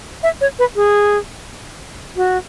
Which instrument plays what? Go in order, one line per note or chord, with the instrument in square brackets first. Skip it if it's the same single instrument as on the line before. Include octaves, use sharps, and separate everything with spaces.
[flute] E5
C#5
B4
G#4
F#4